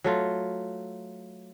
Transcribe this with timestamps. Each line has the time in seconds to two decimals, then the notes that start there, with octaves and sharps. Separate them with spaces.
0.04 F#3 A3 F4